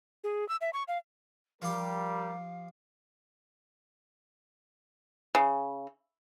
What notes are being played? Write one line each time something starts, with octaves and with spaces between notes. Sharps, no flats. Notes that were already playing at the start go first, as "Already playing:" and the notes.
G#4
E6
E5
C#6
F5
F3 G3 G4 A#4 F5
C#3